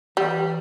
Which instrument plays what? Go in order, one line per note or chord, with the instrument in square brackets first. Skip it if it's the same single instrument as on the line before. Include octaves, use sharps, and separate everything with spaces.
[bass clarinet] E3 [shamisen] G3